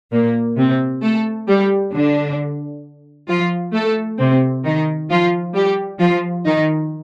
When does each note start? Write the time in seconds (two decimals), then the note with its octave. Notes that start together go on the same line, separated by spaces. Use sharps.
0.12 A#2 A#3
0.58 C3 C4
1.02 A3 A4
1.48 G3 G4
1.93 D3 D4
3.28 F3 F4
3.74 A3 A4
4.19 C3 C4
4.65 D#3 D#4
5.10 F3 F4
5.55 G3 G4
5.99 F3 F4
6.45 D#3 D#4